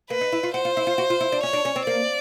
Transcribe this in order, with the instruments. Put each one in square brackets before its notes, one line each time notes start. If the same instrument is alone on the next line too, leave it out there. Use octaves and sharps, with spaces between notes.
[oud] A#3 [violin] B4
[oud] D#4
E4
F4
[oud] F#4 [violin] C5
[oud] F4
E4
F4
F#4
F4
E4
D4
[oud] C#4 [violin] C#5
[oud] D4
C#4
C4
[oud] A#3 [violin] D5